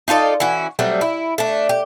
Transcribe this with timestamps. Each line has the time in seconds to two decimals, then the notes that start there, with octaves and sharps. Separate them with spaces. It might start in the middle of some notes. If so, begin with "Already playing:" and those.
0.08 D#4 F4 A4 D5
0.40 E3 C#4 F#4
0.79 F#3 G3 A3 C4
1.01 E4
1.38 A3 D4
1.69 G4